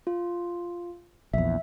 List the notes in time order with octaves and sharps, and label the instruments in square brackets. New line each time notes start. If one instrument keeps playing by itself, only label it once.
[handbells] F4
[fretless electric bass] A#1 E2 [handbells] E5